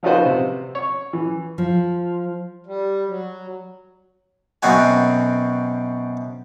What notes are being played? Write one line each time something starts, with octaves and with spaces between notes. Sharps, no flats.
F3 D#4 F4 F#4 B4 C5
C3
C#5
E3
F3
G3
F#3
F#2 B2 C4 F#4 G#5